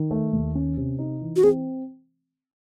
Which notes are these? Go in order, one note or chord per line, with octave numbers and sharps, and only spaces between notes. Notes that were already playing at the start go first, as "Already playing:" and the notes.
Already playing: D#3
A3
D#2
C#4
C3
D#4
E3
F#4
C4 G#4